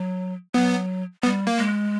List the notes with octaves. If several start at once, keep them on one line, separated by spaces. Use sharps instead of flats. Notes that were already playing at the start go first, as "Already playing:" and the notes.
Already playing: F#3
F#3 B3
G3 B3
A#3
G#3